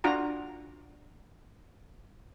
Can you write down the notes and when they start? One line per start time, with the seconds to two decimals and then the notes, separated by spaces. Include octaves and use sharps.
0.04 D4 F4 F#4 A#5